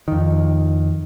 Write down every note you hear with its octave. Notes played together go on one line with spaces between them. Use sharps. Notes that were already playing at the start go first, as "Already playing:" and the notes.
F2 D#3